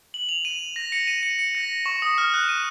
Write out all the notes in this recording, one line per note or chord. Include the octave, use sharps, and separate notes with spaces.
F#7
F7
D#7
A#6
C#7
D#7
C#7
C#7
A#6
C#6
D#6
F6
F#6
D#7